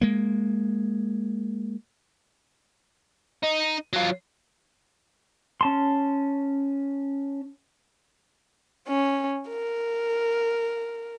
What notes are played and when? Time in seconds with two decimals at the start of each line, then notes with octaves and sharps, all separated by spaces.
0.01 G#3 A#3
3.43 D#4
3.93 F#3 F4
5.61 C#4 A5 C6
8.88 C#4
9.49 A#4